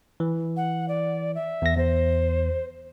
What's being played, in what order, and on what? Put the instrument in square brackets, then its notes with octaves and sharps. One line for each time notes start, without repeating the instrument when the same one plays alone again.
[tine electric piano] E3
[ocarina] F#5
D5
E5
[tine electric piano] E2 A#6
[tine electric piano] E2 [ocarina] C5